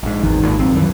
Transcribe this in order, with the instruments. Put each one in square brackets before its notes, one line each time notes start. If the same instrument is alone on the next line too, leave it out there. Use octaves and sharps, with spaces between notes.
[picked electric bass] A#1 G#2
[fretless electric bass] G#1 D#3 [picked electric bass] E2
[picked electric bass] D#2 A#2
A#1 F3 C4
[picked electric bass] C2 D#3 E3 [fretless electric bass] F#2